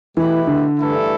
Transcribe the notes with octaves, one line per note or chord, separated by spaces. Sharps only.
B2 E3 A3 E4 G4 B4
D3
G2 E3 A3 E4 A4